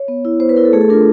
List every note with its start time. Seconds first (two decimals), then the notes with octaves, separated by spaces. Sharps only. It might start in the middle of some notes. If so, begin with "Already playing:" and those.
Already playing: C#5
0.08 B3
0.25 E4
0.40 B3 C5
0.49 B4
0.56 E4 A#4
0.65 A4
0.73 A3 G#4
0.81 A4
0.90 D4 F4 A#4